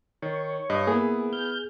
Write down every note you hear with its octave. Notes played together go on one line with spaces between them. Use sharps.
D#3 C#5
G2 D#5
A#3 B3 E4 G#4 B4
F6 G6